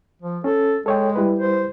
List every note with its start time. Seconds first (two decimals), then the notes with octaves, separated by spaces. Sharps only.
0.22 F3
0.44 C#4 A4
0.86 G#3 A4 C#5 G5
1.16 G3 E4 B4
1.39 C5